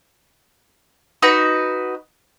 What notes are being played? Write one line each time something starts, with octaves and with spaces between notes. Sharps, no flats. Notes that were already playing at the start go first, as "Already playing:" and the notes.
D#4 F#4 B4